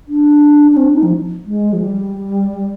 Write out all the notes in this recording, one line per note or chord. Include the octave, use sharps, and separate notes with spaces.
D4
D4
C4
D4
D#4
F3
G#3
F3
G3